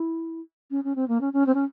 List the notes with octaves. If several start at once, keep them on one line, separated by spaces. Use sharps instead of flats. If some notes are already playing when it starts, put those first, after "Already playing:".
Already playing: E4
C#4
C#4
C4
A#3
C#4
C#4
C4
C#4